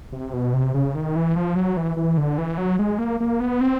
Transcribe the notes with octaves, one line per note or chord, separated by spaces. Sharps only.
C3
B2
C3
C#3
D#3
E3
F3
F#3
E3
E3
D3
E3
F#3
G#3
A#3
A#3
B3
C4